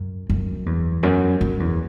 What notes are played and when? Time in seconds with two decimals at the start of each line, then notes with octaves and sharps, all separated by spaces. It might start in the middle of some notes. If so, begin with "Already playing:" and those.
Already playing: F#2
0.30 F#2
0.66 E2
1.03 F#2
1.41 F#2
1.60 E2